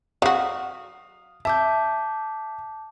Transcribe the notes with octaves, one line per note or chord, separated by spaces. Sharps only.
F#3 F#4 F5 D#6
E5 A5 D6 G6